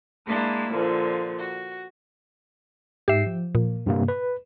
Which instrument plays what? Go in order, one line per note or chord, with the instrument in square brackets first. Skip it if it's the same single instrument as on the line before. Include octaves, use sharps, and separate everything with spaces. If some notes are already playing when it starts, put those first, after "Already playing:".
[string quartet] G#3 A#3 D4 E4
A#2 D3 F3
F#4
[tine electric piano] G#2 C7 [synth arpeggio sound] G4 E5
[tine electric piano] F3
[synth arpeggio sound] A#2
[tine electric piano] G2 C3 A#3
B4